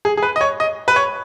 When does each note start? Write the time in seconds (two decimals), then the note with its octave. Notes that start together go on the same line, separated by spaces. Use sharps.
0.05 G#4
0.17 G#4
0.23 B4
0.36 D#5
0.41 C#5
0.60 D#5
0.88 B4
0.96 C#5